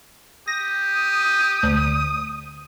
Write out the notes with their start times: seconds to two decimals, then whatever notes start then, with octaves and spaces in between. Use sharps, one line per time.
0.48 G4 D#6 A#6
1.63 D2